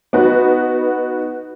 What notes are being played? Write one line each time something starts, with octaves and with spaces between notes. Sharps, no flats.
B3 D#4 F#4 B4